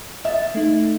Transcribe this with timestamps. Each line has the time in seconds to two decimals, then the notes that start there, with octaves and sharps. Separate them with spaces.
0.25 D#5 E5 A6
0.55 A3 D#4